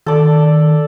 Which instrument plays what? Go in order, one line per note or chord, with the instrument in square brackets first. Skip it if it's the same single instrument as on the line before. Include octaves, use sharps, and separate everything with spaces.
[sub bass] D#3 [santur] A4 D5